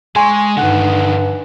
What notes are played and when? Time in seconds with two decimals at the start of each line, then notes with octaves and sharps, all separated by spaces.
0.16 G#3 G#5 C6 C#6
0.57 G2 D3 D#3 F#5 F#6